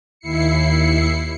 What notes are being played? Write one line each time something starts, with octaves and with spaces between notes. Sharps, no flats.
D#2 E4 C7 C#7